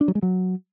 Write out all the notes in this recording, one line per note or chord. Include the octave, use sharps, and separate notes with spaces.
D4
F#3
G#3
F#3